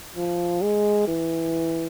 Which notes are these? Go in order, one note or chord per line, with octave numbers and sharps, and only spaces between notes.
F3
G#3
E3